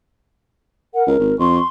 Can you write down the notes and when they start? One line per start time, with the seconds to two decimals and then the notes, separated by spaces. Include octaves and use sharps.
0.94 A#4 F#5
1.06 C#2 A#4
1.20 G#1
1.39 F2 C6 C#6